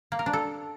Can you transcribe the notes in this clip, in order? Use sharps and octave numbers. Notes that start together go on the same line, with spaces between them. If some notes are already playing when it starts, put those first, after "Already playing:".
A#3
A#4
D4
A4